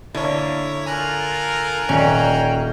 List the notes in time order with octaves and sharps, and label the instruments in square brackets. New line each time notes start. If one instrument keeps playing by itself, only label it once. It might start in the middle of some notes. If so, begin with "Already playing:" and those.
[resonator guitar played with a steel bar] D3 [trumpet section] A#3 [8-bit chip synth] E4 C#5
[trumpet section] F4 A4 A#4 [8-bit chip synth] G#5 A#5 F#6
[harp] D#1 D7 [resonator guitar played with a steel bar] C#4 [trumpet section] F#4 F5 G5